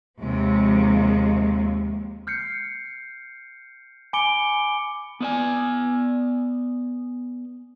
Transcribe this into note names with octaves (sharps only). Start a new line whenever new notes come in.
D#2 C3 F3 G#3
F6 G6 C7 C#7
G#5 B5 D6 C#7 D7 G7
B3 D4 D5 G#5